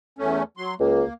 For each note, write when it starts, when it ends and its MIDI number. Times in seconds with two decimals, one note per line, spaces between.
0.19 0.43 40
0.19 0.43 57
0.19 0.43 61
0.57 0.75 54
0.57 0.75 84
0.80 1.03 37
0.80 1.13 58